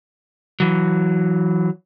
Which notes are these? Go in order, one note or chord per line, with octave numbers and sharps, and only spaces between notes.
E3 F#3